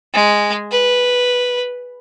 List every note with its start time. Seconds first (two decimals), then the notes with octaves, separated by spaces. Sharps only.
0.13 G#3
0.71 B4